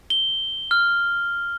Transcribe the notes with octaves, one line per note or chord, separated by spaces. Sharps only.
G7
F6